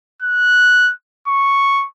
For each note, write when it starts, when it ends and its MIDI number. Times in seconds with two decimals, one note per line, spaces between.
0.22 0.92 90
1.28 1.86 85